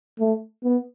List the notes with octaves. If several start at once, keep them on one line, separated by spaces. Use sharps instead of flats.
A3
B3